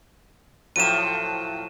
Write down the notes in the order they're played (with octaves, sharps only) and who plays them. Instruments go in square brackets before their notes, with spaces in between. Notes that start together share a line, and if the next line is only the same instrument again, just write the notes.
[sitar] A2 F3 F#3 [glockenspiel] D#7 E7